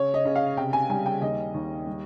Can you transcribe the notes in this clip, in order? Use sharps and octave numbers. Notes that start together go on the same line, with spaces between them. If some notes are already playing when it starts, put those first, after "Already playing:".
Already playing: C#3 C#5
D#5
C#3
F5
C3 G5
G#5
G3 G#5
G5
D#2 D#5
D#2
G3